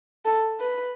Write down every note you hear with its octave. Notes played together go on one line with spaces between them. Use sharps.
A4
B4